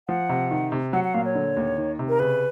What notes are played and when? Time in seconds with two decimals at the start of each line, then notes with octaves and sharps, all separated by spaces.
0.09 F3 F#5
0.29 C3
0.51 D#3
0.72 C3
0.93 F#3 F#5
1.04 F#5
1.14 A#2 F5
1.25 C#5
1.35 D3
1.57 D#2
1.78 D#3
1.99 C3
2.09 A#4
2.19 C#3 B4